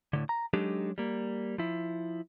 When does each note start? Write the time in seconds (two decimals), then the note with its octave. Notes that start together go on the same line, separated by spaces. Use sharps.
0.13 A2 D3
0.29 A#5
0.54 F#3 G#3 D4 D#4 G4 A4
0.98 G3 A#3
1.58 F3 E4